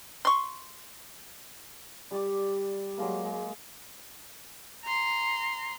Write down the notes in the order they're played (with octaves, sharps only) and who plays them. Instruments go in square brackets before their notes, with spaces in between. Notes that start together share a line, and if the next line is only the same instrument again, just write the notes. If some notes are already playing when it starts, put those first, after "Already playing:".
[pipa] C6 C#6
[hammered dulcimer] G3 G4 D5 D6
F#3 G#3 A#3
G#3
[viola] A#5 C6